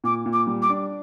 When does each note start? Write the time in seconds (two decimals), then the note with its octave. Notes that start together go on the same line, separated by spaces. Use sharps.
0.04 A#2 D6
0.26 A#2
0.33 D6
0.47 G3
0.62 D6
0.70 D4